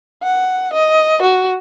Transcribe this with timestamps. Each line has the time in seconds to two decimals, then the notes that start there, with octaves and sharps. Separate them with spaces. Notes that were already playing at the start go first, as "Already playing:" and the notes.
0.24 F#5
0.73 D#5
1.22 F#4